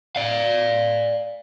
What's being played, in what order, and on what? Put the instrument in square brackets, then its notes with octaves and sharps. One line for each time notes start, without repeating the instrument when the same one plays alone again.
[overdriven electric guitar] D5 F5